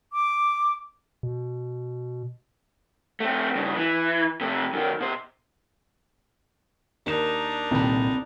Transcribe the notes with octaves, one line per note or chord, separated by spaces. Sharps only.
D6
B2
A3 C4
G2 C#3
E3
C3 A3
F#2 D#3
B2 C5
D#2 D4 D#4 A#4 E7
D#1 C2 A#2 D#3 C4 B5